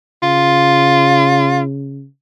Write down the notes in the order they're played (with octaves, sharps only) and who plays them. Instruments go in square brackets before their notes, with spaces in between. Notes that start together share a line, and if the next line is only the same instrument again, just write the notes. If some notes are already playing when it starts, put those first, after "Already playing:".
[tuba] C#3 [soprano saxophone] F4